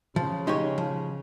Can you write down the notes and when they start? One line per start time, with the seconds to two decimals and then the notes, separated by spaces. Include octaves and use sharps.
0.16 C#3 F3
0.47 G#3 D#4 G4 C#5
0.78 F3